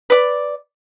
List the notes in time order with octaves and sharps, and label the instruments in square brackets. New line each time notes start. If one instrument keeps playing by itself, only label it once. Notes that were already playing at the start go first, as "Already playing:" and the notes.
[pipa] B4 D5